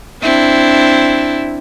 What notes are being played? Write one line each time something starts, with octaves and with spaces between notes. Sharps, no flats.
C4 D4 E4